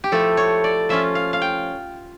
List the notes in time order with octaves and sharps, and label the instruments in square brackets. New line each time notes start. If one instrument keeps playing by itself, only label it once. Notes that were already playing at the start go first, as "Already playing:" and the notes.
[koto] G4
F3 A3 E4 A4
C#5
D5
F3 C#4 F4 E5
F5
F5
G5